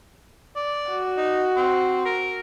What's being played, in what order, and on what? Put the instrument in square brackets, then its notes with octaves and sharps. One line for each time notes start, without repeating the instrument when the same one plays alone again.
[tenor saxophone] D5
[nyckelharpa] F#4
[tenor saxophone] D#4
C4
A#4